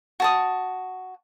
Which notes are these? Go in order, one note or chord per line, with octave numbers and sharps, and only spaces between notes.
F#4 A5 D#6